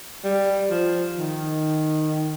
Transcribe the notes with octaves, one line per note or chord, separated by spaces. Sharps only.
G3
F3
D#3